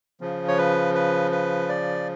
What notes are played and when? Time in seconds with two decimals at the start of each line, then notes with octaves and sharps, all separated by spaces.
0.21 C#3 F3
0.48 C#5
0.58 B4
0.95 B4
1.32 B4
1.69 D5